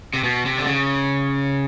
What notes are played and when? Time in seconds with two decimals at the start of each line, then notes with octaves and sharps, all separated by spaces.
0.14 C3
0.24 B2
0.46 C3
0.58 D3
0.67 C#3